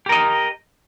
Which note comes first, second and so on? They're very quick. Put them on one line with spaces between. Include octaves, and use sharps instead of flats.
G4 A#4 D#5